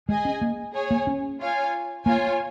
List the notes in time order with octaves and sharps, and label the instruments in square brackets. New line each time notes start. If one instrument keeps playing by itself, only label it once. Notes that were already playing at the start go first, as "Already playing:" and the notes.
[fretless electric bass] G#3 [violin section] G#4 D#5 G#5
[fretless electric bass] C#4
A#3
[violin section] G#4 C#5 G#5
[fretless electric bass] A#3
C#4
[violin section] F4 C#5 F5 G#5
[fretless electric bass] A#3 [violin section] F4 C#5 G#5